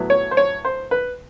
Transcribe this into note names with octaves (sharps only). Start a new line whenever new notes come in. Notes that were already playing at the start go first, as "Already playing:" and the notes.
Already playing: A2 F#3 B3 E4
C#5
C5
C#5
C5
B4